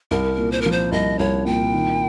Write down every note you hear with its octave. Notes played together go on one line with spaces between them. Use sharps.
C2 A#4
A#2
C5
F3 A#4
C5
C2 D#5
C2 C#5
A#2 G5
D#3